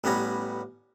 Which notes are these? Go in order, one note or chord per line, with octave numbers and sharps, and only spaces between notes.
A1 G3 B3 C#4 A#5